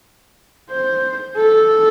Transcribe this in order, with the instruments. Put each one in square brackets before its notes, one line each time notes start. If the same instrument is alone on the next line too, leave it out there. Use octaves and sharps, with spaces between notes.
[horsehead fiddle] C5
A4